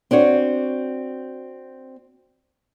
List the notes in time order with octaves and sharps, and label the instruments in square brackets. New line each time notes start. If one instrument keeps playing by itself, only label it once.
[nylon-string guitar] C4 D4 F#4 C#5